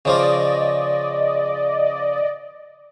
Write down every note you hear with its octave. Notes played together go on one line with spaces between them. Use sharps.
C#3 F3 F4 D5 D#5